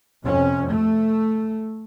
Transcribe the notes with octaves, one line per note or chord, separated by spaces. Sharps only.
F2 C3 C#4
A3